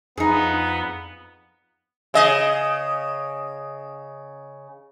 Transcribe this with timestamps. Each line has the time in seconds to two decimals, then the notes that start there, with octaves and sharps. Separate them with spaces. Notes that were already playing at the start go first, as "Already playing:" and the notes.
0.17 F2 B3 D#4 G#4
2.14 C#3 D#5